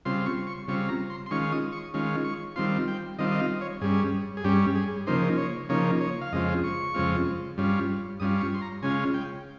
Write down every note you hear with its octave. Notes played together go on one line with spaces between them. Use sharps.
C#3 G3 C4 F4 C6
C6
C#6
C#6
C#3 G3 C4 F4 C#6
A#5
C6
C6
D#3 G#3 C#4 F4 C#6
D#6
C#6
D#3 G#3 C#4 F4
C#6
D#3 G3 C4 F4 C6
G5
D#3 G3 C4 F4 D#5
D#5
F5
C#5
G2 G3 C#4 G#4
G#4
G2 G3 C#4 G4
G#4
C#3 F3 A#3 D#4 C5
C#5
C#3 F3 A#3 D#4 C#5
C#5
F5
F2 C#3 G#3 C4 F4 D#5
C#6
F2 C#3 G#3 C4 F4
G2 G3 C#4 F4
G2 G3 C#4 F4 D#6
C#6
C6
A#5
C#3 G#3 C#4 F4 G#5
G5